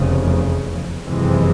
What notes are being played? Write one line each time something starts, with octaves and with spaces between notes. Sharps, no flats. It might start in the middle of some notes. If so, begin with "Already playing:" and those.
Already playing: F1 E2 C#3
F#1 F2 C3 E3 G#3